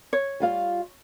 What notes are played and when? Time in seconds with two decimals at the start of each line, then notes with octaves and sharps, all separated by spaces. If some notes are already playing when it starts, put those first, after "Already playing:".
0.13 C#5
0.40 G3 F4 F5